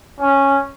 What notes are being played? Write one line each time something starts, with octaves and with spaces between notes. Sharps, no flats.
C#4